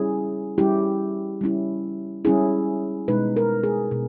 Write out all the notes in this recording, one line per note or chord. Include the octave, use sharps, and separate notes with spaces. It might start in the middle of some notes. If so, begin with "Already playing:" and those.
Already playing: G3 C#4 E4 G#4
G3 C#4 E4 G4
G3 C#4 E4
G3 C#4 E4 G#4
B2 G#3 D#4 B4
A#4
G#4
B2